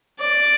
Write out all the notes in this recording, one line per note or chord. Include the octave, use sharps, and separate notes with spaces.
D5